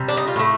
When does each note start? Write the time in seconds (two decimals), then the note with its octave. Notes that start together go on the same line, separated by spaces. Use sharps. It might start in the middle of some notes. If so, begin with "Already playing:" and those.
Already playing: C3 G3
0.08 D4
0.17 D#4
0.27 F4
0.36 A2 A3